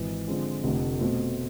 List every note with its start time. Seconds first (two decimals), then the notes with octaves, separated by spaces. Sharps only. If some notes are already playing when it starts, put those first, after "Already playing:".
Already playing: G#1 G#2 E3
0.27 D3 F3 G#3 C4
0.64 F1 F2 D3 A3
0.99 B2 A3 C4